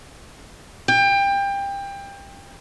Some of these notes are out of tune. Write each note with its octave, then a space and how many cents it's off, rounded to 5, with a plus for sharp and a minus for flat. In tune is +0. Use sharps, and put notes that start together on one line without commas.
G5 +25